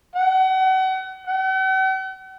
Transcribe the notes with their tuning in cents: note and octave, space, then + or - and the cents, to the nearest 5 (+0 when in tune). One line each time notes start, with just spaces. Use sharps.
F#5 +35
F#5 +45